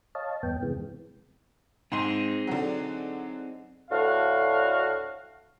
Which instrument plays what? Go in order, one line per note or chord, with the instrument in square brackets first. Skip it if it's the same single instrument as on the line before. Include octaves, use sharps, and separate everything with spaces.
[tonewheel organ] C#5 D#5 F5 A5
E2 G2 B3 G5
C3 E3 G#3 B3
[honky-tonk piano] G#2 C6 [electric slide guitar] C4 D#4 G#4
[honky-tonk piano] D3 F#3
[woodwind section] D2 A2 D3 F#4 F5